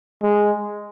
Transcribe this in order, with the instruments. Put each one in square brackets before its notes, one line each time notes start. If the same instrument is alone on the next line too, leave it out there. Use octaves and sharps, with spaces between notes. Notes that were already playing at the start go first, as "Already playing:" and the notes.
[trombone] G#3